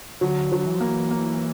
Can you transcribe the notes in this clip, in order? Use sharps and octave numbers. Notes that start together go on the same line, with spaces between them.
D3 F#3
F#3
E3
F3 A#3
E3
A#3